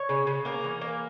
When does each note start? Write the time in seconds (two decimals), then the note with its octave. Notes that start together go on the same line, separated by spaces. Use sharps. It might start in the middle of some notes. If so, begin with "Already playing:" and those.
Already playing: C#5
0.09 C#3
0.27 C#3
0.45 A#3 A#4
0.64 E3
0.81 A#3